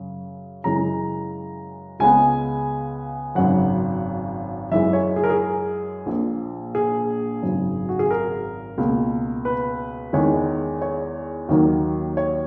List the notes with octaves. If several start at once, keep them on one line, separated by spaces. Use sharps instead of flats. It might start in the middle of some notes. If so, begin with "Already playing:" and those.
Already playing: F#2 C#3
F#2 C#3 E3 G#3 A#5
C#2 C#3 G#3 B3 G#5
G#1 F#2 C#3 F#3 F#5
F#2 E3 G#3 E5
C#5
G#4
A#4
G#4
A#1 A#2 A#3
G#4
G#1 F#2 C#3 F#3
F#4
G#4
A#4
C#2 B2 A#3
B4
E2 D#3 G#3 C#5
C#5
D#2 D#3 F#3 A#3
C#5